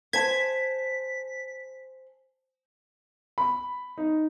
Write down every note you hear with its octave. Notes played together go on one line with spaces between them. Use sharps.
C5 G#5 A5 G#6 B6
B5
D#4